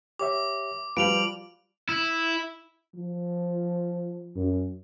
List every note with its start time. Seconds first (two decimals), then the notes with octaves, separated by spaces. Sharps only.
0.19 G4 C#5 E5 D6
0.97 F3 G3 F#4 B4 F5 D7 F7 F#7
1.89 E4
2.95 F3
4.36 F#2